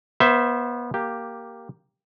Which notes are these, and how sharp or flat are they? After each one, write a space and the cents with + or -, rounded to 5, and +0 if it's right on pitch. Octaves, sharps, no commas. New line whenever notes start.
B3 -25 C5 +0 E5 +0
A#3 +0 G4 +0